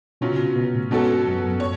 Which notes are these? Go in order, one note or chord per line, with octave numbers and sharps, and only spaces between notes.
B2 F#3 C#4 F4
C#3
B2
B2
A2
G#2 B2 F#3 C#4 F#4 A4
F#2
F#2
C#5